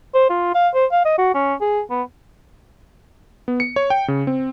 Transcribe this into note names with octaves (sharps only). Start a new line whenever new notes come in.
C5
F4
F5
C5
F5
D#5
F#4
C#4
G#4
B3
B3
C#7
C#5
G5
C#3
C4